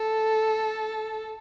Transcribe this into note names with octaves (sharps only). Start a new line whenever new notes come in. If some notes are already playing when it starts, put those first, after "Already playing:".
Already playing: A4